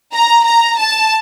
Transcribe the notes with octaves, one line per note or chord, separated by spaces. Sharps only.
A#5
A#5
A5